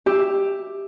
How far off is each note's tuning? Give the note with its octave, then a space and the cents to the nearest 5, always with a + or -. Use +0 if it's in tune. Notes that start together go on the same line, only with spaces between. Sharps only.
G4 +5 E5 +0